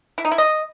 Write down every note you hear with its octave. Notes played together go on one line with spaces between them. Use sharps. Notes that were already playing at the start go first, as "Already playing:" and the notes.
E4
D#4
E4
D#5